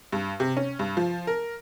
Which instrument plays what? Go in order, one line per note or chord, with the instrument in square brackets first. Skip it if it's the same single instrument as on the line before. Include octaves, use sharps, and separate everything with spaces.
[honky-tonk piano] G2
C3
C#4
G2
F3
A#4